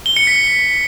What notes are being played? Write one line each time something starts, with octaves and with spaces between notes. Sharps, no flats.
G7
C#7
B6